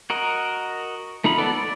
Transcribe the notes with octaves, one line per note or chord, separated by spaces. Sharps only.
F#4 A#4 D#5
A3 D#4 F4 B5
B3 A4 D5
D5